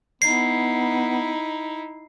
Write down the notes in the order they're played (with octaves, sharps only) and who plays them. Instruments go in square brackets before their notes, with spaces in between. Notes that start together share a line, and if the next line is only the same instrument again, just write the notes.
[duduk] B3 [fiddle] D#4 E4 [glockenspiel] C7